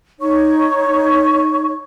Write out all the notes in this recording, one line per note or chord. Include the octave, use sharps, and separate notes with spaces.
D#4 C#5 C#6